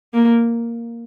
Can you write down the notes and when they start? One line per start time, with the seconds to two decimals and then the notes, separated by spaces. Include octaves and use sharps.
0.13 A#3